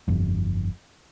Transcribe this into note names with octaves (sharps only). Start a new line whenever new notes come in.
G1 F2